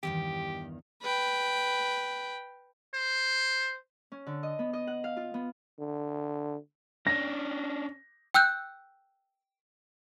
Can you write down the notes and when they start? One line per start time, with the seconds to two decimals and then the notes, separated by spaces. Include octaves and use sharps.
0.03 E2 G2 D#3 G4
1.03 B4 G5
2.94 C5
4.12 C#4
4.27 D3
4.43 D#5
4.59 B3
4.73 D#5
4.87 F#5
5.04 F5
5.17 F4
5.34 B3
5.79 D3
7.07 C#4 D4 A#6
8.34 G5 E6 F#6 G6